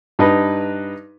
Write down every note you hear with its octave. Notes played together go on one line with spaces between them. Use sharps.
G2 D#4 B4